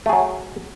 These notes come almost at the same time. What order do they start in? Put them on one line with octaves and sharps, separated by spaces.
A3 G#4 F#3